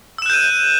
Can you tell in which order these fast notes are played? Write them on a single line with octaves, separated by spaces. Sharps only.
E6 E7 F#6 G6 D#7